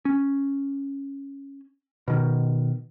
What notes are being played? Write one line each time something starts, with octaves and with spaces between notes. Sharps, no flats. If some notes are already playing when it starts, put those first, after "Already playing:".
C#4
B2 D#3